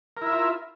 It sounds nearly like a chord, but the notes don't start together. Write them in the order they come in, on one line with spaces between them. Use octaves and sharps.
A#4 E4 E5 F4